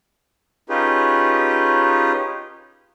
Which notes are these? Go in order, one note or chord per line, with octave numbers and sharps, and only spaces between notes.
C#4 D#4 F4 G4 G#4 B4